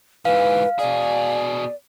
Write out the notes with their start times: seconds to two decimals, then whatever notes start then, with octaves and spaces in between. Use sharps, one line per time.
0.25 G#2 E3 B4 F5
0.79 B2 G#4 D5